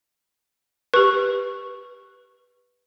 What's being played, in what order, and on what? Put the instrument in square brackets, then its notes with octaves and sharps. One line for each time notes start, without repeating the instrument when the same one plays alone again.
[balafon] G4 C#6 [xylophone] B4